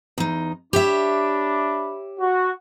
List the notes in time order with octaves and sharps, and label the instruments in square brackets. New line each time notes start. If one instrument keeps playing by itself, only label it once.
[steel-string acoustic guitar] E2 D#4
[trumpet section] D4 B5 D6 [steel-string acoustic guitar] G4 C#5 E5
[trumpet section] F#4